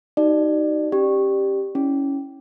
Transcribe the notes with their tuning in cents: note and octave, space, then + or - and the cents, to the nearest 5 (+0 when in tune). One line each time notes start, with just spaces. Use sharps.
D#4 +0 F#4 +40 D5 +25
C#4 -20 G4 +0 D5 +15
C#4 +0 E4 -25